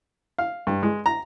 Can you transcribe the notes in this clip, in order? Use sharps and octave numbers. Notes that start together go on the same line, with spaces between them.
F5
G2
G#3
A#5